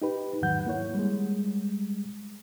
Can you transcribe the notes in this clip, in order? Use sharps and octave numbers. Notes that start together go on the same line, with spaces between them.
D#4 G4 B4
E2 G#2 D#3 F#3 F#5 G6
A#3 E4 C#5
G3 G#3